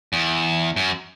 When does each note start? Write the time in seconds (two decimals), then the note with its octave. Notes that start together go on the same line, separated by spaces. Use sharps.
0.13 E2
0.76 F#2